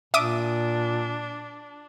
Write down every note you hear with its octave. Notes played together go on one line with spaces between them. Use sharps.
A#2 D4 E5 D6 D#6